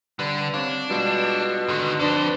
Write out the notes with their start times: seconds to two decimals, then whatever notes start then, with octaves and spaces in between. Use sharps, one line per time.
0.19 D3 G3 B4 D5
0.54 C4 D4 C#5 F5
0.90 B2 G3 G#3 F4
1.68 G#2 D3 D#3 C6
1.99 F2 D4 B4 C5